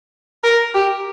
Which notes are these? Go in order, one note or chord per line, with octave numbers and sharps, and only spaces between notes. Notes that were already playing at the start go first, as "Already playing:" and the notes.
A#4
G4